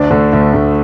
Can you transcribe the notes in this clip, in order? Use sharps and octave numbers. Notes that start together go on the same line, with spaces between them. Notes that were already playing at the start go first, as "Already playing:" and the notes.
Already playing: D2 D4
D3 A3
D2
D3 A3